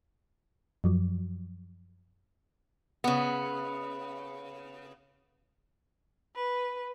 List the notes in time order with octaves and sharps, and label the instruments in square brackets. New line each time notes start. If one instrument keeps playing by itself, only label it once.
[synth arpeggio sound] F#2 F3 F#3
[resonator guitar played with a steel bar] C#3 B3
[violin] B4